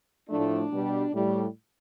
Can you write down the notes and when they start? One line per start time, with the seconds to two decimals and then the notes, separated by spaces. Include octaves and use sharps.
0.29 A2 F3 A3 D4
0.71 B2 G3
1.13 A2 G3